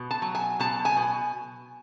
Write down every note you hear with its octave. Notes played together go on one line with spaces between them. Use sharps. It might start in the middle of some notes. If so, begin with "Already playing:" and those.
Already playing: B2
A5
F#3
G#5
B2 A5
G#5
B2